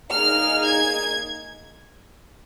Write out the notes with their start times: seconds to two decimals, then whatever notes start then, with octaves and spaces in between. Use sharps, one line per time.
0.11 A#3 D#4 G#4 F6
0.66 G#6